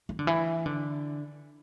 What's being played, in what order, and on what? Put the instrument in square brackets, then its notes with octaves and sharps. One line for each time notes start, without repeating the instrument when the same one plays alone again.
[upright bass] E3
D3
E3
D3